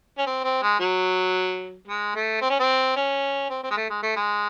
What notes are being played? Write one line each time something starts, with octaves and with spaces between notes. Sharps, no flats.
C#4
C4
C4
G#3
F#3
G#3
A3
C4
C#4
C4
C#4
C4
C4
G#3
A3
G#3
A3
G#3